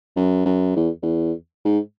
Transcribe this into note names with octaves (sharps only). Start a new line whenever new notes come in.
F#2
F#2
E2
E2
G#2